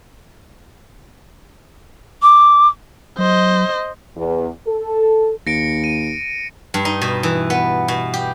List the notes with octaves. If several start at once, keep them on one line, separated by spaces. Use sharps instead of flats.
D6
F#3 C5 D#5
E2
A4
D#2 A#6 C#7 D7
D#7
G2
D#4
B2
E3
B3
B2
G4